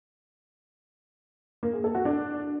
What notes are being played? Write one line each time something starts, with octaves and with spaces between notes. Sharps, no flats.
A#3
G#4
A4
F#4
D4